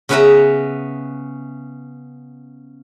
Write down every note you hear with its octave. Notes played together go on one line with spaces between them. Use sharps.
C#3 B3 C#4 B4 E5 A#5